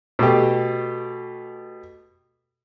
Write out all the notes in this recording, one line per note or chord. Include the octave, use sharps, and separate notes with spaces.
B2 A3 G4